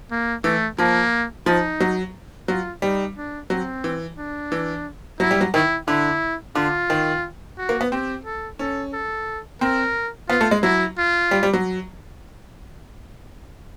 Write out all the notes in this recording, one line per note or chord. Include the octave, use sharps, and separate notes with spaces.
A#3
E3 A3
F3 A#3
F3 D#4
F#3
F#3 F4
G3 D#4
D4
F#3 C4
E3
D4
E3
F#3 E4
G3
F#3
D#3 E4
D3 E4
D3 F4
D#3
F#4
A#3
B3
C4 G4
A4
C#4 A4
A4
C4 A#4
B3 F4
A3
G#3
F#3 E4
F4
G3
G3
F#3